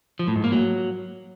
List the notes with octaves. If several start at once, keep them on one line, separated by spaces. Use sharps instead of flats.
F3
A2
G#2
A#3
F#3